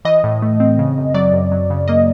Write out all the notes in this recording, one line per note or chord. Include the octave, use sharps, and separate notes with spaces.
E3 D#5
A2
A3
C4
C#3
F#2
F#3 D5
F#2
F#3
C#3
A#3 D#5